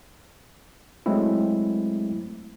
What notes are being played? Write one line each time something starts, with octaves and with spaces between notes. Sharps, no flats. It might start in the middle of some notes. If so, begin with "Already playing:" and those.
F#3 G#3 A3 C4 E4